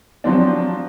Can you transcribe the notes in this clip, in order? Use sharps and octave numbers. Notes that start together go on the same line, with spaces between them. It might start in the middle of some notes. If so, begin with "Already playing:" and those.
F3 F#3 C4 D4